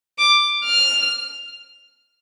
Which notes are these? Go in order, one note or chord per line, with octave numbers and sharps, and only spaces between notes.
D6
F6